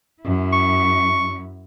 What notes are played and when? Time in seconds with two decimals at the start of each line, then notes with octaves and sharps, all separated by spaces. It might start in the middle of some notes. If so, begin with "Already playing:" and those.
0.22 F#2 E4
0.53 C#6